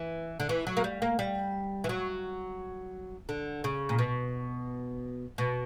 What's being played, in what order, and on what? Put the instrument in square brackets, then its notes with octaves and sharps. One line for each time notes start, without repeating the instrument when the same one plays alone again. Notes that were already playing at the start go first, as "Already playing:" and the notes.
Already playing: [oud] E3
D3
E3
F#3
A#3
G3
A#3
G3
E3
F#3
D3
C#3
A#2
B2
B2